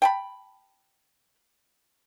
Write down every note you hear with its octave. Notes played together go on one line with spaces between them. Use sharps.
G5 A5 B5